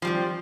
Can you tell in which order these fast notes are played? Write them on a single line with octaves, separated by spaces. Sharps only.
F3 G3 C4